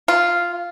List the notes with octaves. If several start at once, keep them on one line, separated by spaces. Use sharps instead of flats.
F4